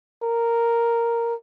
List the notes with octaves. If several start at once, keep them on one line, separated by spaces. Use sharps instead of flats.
A#4